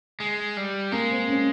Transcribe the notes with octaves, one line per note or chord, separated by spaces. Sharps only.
G#3
G3
G#3 A#3
C4
C#4